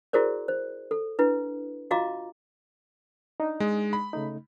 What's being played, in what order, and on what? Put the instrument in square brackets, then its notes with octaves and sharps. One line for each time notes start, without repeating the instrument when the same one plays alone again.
[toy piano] E4 F#4 G#4 A#4 C5 D5
C5
A4
D4 E4 B4
F4 F#4 D#5 F5 A#5 D6
[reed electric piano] D4 D#4
[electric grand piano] G#3
B5
[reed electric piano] C#3 A3 D#4